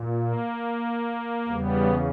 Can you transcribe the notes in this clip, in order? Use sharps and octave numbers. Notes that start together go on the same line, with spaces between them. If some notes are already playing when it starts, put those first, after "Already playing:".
Already playing: A#2
A#3
E2 C#3 G3 B3